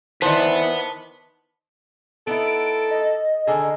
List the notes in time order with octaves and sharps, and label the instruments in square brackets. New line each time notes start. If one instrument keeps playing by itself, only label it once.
[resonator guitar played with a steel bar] D#3 C5 [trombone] E3 [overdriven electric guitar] B4 F#5 [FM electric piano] D5 A5
[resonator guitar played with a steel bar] B3 D#4 E4 [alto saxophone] A4 [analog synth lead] D7
[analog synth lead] D#5
[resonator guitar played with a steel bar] D3 D#3 G#4 [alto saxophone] A4